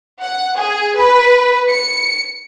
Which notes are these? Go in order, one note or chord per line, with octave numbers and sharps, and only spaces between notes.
F#5
G#4
B4
C#7